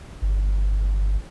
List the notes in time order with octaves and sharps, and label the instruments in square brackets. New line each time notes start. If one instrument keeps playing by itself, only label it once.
[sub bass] G1